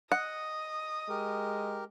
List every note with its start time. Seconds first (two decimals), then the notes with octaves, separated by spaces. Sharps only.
0.12 D#5 F#5 D#6
1.09 G#3 G4 A#4